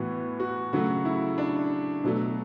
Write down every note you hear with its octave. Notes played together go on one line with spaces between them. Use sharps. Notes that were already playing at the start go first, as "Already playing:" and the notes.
Already playing: A2 E3 B3 F#4
F#4
C#3 F#3 A3 F#4
E4
D4
B2 F#3 A3